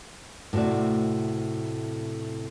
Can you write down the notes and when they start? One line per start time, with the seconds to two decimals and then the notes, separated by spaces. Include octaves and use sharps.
0.53 A2 C3 A3 F#4 D5